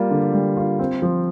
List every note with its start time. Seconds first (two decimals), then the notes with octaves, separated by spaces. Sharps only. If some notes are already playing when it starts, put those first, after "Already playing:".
Already playing: G3 A#3 F4
0.11 D3
0.34 G3
0.57 F4
0.79 C4
1.02 F3